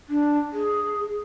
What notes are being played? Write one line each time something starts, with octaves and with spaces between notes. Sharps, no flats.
D4
G#4